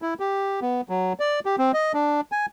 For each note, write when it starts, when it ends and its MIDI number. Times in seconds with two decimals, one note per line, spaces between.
0.02 0.14 64
0.20 0.60 67
0.62 0.81 59
0.89 1.13 54
1.20 1.40 74
1.46 1.56 67
1.59 1.72 60
1.74 1.92 75
1.94 2.21 62
2.32 2.46 80